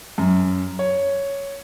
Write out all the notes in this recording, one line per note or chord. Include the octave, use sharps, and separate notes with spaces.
F#2
C#5